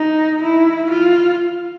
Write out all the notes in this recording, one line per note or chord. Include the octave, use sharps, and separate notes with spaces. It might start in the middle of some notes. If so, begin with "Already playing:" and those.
Already playing: D#4
E4
F4